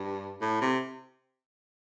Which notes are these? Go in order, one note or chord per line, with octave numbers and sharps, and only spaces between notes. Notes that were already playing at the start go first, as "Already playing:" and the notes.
Already playing: G2
A2
C3